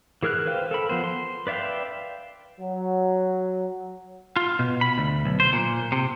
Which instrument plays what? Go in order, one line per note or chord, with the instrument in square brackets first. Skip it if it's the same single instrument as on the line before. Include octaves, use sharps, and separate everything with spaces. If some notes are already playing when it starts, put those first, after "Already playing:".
[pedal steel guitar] E3 G#4 A#4 F6 F#6
B4 C5 F5 G5
A4 A#4 B5
F3 B3 C5
C6
B4 D5 E5 F5 G5
[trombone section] F#3
[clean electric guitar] F4
B2
B5
D2
B1
C5
A#2
C3